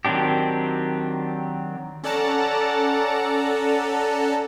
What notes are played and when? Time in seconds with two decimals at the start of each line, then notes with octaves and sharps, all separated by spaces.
0.05 D#3 F#3 C4 D4 G4
2.03 C#4 A4 D5 F#5 A5 A#5